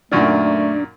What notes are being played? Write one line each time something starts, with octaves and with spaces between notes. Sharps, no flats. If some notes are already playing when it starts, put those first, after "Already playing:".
F#2 A#2 D#3 A3 D4 D5 C#6